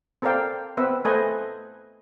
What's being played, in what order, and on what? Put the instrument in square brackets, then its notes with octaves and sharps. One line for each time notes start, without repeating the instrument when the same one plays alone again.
[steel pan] C4 A4 A#4 D5 F5 G5
B3 C4 B4 E5
A3 A4 B4 C5 D#5 G#5